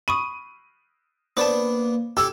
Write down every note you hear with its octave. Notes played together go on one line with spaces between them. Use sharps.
B5 C#6 D#6 D#7
A#3 B3 D4 B4 C5 D5 A5
G4 A4 G#5 E6